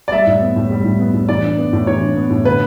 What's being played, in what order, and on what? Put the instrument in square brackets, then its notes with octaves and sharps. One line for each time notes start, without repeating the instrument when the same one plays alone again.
[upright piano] D5
[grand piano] G3 [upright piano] E5
[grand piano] A2
B3
A2
G3
A2
B3
A2
[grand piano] E3 [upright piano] D5
[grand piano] D4
B3
A2
[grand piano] E3 [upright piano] C#5
[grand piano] D4
B3
A2
[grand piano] D3 [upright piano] B4